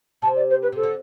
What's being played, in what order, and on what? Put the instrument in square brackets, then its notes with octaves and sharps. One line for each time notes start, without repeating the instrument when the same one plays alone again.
[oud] C3 [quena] A5
[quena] D5
C5
B4
[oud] C3 [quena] A4
[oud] D3